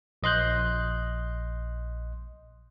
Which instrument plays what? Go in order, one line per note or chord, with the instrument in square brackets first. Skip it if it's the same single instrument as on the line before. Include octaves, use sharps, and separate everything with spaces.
[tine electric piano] A#1 D#5 C6 F#6 G6